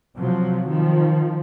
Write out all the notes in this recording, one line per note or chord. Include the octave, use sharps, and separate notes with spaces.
C3 F3 F#3
D#3 F3